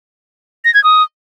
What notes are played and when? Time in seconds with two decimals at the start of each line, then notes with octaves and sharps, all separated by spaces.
0.65 A#6
0.74 G#6
0.84 D#6